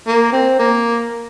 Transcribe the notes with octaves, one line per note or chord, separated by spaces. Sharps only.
A#3
C4
A#3